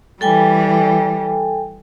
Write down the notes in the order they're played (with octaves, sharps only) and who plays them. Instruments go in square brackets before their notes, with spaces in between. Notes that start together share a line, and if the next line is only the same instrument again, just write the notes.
[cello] E3 G3 [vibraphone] A4 G5 G#5